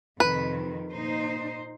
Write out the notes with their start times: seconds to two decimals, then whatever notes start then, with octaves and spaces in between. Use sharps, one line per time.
0.20 F2 C3 D#3 B4
0.91 A#2 D#4 C5